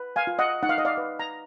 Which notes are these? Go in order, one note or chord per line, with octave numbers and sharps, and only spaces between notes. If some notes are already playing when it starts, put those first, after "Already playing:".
Already playing: B4
F5 G#5
F4
D#5 F#5
D#4 F#5
F5
D#5
D5 F5
B4
A#5